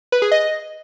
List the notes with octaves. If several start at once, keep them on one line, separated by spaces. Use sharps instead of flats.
B4
G#4
D#5